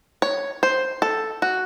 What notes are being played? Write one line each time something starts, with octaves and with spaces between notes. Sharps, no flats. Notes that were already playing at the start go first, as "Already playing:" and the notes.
C#5
C5
A4
F#4